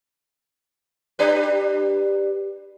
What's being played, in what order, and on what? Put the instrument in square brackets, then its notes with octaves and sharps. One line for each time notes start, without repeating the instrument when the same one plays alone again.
[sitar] D4 G4 B4